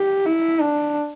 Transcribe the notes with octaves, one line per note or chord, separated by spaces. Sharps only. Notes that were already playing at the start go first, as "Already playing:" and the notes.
Already playing: G4
E4
D4